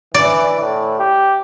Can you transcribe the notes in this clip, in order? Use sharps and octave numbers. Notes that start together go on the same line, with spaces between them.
E3 D5
A2
G4